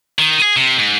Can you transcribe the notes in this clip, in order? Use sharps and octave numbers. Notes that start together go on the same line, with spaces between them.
D#3
G#4
C3
G#2